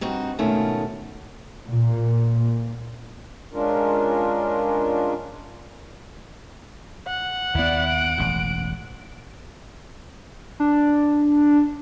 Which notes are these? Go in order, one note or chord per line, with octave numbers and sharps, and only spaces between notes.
G2 C4 D#4 F#4
G#2 B2 D#3 A3 C#4 F4
A#2
G#3 C#4 D4 F4 A#4
F#5
D#2 B3 E4 D5
D7
E1 A1 F#2
D4